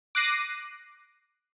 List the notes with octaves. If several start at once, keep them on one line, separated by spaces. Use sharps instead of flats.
D6 F#6 A#6 C7 D#7